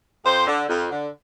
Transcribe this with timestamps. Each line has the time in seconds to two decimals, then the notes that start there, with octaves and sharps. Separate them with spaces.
0.25 F2 C5
0.47 D3
0.68 F2
0.90 D3